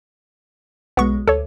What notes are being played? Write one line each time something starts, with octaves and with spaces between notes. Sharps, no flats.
B1 G#3 B3 C#6
D2 A4 C#5